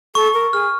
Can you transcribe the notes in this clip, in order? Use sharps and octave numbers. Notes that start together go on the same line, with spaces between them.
A4 C#6
A#4
G#4 F6